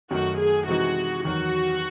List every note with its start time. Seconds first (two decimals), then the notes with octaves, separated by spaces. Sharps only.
0.10 F#2 D#3 A3 D#4 F#4
0.39 G#4
0.67 C3 E3 G#3 D#4 F#4
1.24 E2 D#3 F#3 F#4